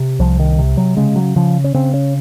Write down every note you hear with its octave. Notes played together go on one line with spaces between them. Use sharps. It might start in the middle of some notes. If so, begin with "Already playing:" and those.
Already playing: C3
C2 F3
D#3
C3
F#3
C#3 G#3
F#3
C#3 F3
C#4
C#3 C4
C#4